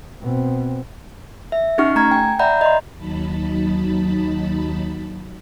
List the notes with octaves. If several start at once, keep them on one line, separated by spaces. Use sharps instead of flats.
B2 C4
E5
C#4 D#4 G4 F#5 C#6 F6
A3 A#5 G#6
G5 G#5
D5 E5 F#5 A#5 B5 G6
D#5 A#5 C6
D#2 F#3 D#4 A5 B5